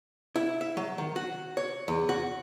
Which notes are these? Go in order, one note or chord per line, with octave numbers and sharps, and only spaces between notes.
E4
E5
F#3
D#3
F#4
C#5
E2
F#4